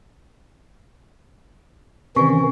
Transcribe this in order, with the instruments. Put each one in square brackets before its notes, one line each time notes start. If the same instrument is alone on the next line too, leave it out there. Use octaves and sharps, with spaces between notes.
[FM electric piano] C3 [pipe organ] D#3 E3 C#4 [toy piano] D5 G#5 C#6